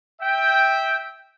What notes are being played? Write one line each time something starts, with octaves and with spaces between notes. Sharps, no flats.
E5 G5